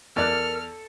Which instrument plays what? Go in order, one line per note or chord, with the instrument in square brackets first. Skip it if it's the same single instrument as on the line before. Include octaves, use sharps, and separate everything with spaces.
[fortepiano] E2 D5 F#6 [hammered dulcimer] A4 [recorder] A#4 [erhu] F6